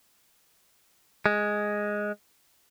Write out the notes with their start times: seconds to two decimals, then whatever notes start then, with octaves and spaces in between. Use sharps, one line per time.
1.26 G#3